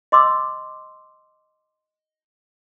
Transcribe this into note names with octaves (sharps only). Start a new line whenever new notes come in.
D#5 C6 D6 E6